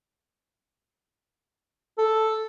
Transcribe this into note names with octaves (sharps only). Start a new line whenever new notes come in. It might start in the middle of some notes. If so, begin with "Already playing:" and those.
A4